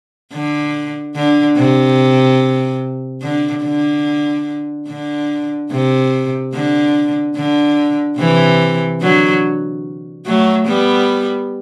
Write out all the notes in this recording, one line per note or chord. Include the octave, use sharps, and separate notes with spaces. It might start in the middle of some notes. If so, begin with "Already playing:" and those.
D3
D3
C3
D3
D3
D3
C3
D3
D3
C3 E3
D3 F#3
F#3 A3
G3 B3